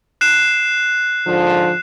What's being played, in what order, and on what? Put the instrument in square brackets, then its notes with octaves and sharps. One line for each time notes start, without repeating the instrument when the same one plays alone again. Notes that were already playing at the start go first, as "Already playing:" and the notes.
[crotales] F#6 C7 E7
[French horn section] G#2 D3 F3